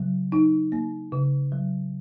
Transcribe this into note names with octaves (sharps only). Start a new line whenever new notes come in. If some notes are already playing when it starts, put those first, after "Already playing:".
Already playing: C#3 F#3
D#4
A#3
C#3
F#3